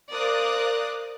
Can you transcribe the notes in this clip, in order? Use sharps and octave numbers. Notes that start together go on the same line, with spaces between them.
A#4 C5 D5 F5 D#6 F#6